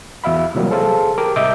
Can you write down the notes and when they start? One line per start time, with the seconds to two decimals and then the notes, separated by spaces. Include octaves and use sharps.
0.24 E2 F#4 E5 F5 B5
0.55 C3 E3 F#3 G3 A#3
0.70 G#4 A4 C5 F5 A5
1.18 G4 A#4 D6
1.36 C2 G#2 D#5 E5 D6 G6